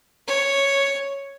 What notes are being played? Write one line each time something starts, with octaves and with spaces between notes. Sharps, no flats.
C#5